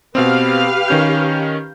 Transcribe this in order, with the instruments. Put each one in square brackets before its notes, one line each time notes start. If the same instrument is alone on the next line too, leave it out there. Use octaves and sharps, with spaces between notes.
[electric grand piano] B2 C4 [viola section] G4 B4 F5
[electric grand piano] D#3 C#4 G6